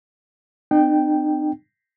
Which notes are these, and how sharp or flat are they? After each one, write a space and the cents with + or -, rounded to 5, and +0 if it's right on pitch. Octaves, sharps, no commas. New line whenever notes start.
C4 -30 D#4 -40 G5 +0